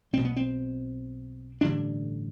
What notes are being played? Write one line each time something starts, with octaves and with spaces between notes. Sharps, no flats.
B1 B2 C4
B3
C4
A1 G2 D3 D4